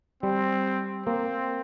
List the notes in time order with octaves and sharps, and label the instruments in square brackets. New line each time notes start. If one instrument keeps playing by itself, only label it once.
[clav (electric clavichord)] G3 [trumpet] C4
[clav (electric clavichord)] A#3 [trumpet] C4